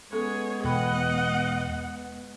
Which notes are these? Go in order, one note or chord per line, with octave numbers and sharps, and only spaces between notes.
G#3 B3 C#4 G#4 A4 C#5
E2 B2 E3 B4 D#5 F#5 G5 B5